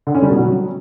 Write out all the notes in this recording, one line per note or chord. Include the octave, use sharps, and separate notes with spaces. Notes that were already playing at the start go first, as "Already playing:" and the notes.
D3
C#4
G3
B2
F#3